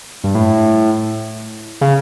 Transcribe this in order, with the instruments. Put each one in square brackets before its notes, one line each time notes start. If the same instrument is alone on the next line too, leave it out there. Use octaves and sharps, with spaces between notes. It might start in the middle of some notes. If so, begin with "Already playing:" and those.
[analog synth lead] G2
A2
C#3